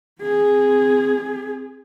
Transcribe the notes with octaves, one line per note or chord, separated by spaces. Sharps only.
C4 G#4